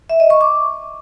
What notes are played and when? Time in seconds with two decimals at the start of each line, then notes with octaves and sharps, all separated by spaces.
0.09 E5
0.20 D#5
0.30 C#6
0.41 D6